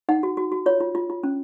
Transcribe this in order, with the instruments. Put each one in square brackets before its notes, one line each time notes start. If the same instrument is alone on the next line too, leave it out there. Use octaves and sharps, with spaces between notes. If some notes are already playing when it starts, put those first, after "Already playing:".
[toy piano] D#4 F#5
F#4
F#4
F#4
F4 C#5
F4
F4
F4
C#4